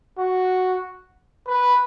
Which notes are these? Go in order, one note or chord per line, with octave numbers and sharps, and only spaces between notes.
F#4
B4